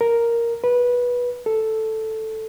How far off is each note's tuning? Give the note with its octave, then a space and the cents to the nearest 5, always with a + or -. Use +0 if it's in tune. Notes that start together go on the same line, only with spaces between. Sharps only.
A#4 +0
B4 -15
A4 +0